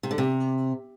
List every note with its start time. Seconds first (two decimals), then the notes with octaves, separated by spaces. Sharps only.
0.03 C3
0.11 D3
0.18 C3